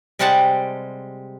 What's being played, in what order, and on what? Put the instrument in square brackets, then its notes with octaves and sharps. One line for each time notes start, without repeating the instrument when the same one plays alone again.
[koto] C3 G3 G#3 G4 F#5 A5